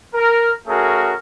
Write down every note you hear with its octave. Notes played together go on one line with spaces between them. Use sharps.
A#4
A3 C#4 F#4 G#4 A#4